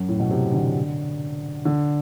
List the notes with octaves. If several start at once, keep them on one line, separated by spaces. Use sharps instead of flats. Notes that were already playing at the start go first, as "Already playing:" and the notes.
Already playing: F#2
A2
B2
C3
D3
D3